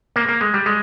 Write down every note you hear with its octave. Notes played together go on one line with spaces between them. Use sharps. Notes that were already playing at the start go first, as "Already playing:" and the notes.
A#3
A#3
G#3
G3
G#3